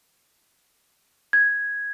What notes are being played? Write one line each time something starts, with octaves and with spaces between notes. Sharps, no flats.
G#6